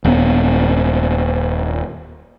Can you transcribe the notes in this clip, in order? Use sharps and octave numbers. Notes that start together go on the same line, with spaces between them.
D#1 B3